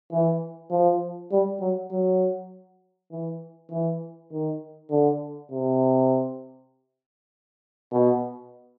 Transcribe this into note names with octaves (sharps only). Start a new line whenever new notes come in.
E3
F3
G3
F#3
F#3
E3
E3
D#3
D3
C3
B2